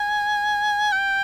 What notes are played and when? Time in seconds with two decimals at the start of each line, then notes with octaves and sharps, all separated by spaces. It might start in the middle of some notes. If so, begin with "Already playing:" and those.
Already playing: G#5
0.92 G5